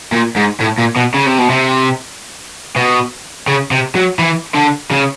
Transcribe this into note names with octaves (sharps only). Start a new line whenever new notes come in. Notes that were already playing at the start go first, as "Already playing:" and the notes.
A#2
G#2
A2
A#2
B2
C#3
C3
B2
C3
B2
C#3
C3
F#3
E3
D3
C#3